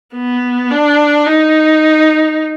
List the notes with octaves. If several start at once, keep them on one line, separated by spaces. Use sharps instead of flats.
B3
D4
D#4